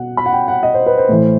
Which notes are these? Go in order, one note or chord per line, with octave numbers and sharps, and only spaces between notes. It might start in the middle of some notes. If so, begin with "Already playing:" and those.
Already playing: B2 F#5
B5
F#5
G5
F#5
D#5
C5
B4
C5
A2 E3